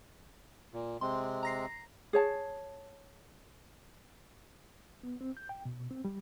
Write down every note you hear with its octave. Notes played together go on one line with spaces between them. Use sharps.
A#2
C3 G#3 C4 C6
A#5 A#6 C7
G#4 C#5 A5
B3
C4
G6
G5
B2
C4
G3